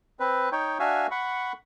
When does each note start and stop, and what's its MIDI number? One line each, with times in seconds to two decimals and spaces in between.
0.20 0.49 60
0.20 0.49 71
0.52 0.78 63
0.52 0.78 73
0.52 0.78 79
0.79 1.07 62
0.79 1.07 66
0.79 1.07 76
0.79 1.07 77
0.79 1.07 80
1.11 1.52 78
1.11 1.52 83
1.11 1.52 85